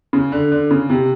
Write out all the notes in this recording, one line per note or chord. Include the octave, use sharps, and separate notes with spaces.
C#3
D3
D3
C#3
C3